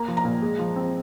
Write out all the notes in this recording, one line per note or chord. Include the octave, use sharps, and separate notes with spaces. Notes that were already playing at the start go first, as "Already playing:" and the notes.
Already playing: A#3 A#5
F3
A#5
A#2
G#3
F3
C4